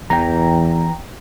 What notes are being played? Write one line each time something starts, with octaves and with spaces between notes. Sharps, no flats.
E2 E3 G5 A#5